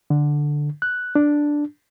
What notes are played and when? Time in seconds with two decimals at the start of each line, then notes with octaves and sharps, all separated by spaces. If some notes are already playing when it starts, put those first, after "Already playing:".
0.10 D3
0.82 F#6
1.15 D4